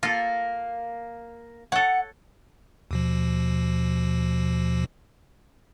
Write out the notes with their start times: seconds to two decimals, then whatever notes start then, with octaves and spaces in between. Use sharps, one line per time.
0.03 A#3 F4 A4
1.72 A4 C#5 F#5
2.91 D#2 B2 F3